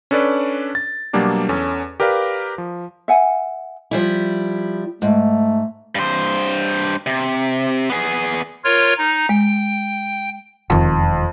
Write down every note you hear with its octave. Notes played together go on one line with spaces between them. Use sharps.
C#4 D4 A4 B4 D5
A6
B2 F#3 G3 A#3 D4 G4
E2 C#4 A4
G4 A#4 B4 D5 F5
F3
E5 F#5 G#5
F3 G3 E4
G#2 A3
G2 C5
C3
B3 G#4
F4 A#4 C#5
D#4
G#3 G5
E1 F2 D#3